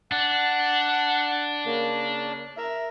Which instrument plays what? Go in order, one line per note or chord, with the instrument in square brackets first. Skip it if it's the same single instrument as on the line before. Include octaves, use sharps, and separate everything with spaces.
[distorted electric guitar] D4 [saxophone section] F#5
[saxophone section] C#3 A#3
A#4 E5